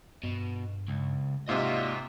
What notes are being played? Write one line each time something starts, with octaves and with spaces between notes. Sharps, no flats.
G2 B2
C#2
G#2 C3 A#3 F4 F#4 D#5 E5